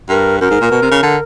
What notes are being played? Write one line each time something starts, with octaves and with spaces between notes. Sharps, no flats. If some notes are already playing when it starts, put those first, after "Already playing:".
G2 A#4
F#2 A#4
G#2
A#2
B2
C3
C#3
D3